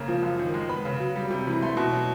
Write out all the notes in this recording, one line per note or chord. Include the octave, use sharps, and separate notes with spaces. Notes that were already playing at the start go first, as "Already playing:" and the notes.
Already playing: C#3 A#3 A#5
F3
F#2
D#3
G#3
B3 B5
C#3
F#3
G3
C3
E3
A3 C6
B2
F#3